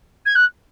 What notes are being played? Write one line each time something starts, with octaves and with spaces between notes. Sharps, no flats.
G#6
F#6